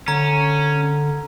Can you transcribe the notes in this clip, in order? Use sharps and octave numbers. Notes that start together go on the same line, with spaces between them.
D3 C#4 A#5